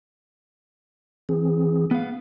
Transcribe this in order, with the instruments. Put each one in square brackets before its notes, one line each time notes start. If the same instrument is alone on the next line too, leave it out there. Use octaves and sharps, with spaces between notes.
[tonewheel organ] E3 C4 G#4
[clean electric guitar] B3 F5